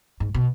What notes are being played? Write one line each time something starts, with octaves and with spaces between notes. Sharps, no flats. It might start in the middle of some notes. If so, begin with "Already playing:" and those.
G#2
B2